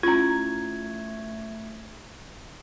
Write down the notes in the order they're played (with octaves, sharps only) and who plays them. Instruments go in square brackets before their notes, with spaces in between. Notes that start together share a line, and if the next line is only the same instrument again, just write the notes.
[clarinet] A3 [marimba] C#4 E4 [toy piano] F4 A#5 [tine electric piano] G#6